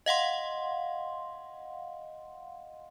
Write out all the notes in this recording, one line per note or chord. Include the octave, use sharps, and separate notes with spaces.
D#5 F5 F#5 C6